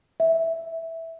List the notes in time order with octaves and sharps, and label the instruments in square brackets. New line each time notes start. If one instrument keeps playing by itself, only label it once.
[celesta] E5